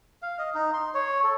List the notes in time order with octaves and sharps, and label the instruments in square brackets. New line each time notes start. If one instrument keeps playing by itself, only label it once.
[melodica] F5
D#5
D#4
C6
C#5
A4